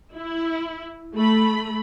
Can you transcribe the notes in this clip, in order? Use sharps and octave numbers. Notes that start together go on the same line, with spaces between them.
E4
A3 B5